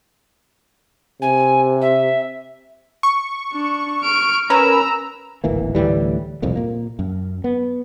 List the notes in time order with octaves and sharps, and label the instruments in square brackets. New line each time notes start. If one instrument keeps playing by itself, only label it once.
[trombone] C3 [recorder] G#5
[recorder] E5
[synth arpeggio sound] C#6
[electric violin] D4
F6 D7
[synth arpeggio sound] C#4 A#4 B4 [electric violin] A#5 E6
[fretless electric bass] D1 G#1 E3 A#3
D2 A2 E3 G3
E1 C2 F2 A#2
A#2 A#3
F#2
B3